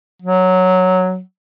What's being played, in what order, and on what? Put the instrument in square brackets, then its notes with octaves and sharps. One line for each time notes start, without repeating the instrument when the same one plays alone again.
[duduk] F#3